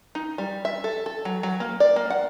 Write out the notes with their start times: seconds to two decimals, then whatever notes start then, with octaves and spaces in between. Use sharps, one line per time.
0.15 D#4
0.38 G3
0.65 E5
0.84 A4
1.06 A4
1.25 F#3
1.43 F#3
1.60 A#3
1.80 D5
1.96 A#3
2.10 F#5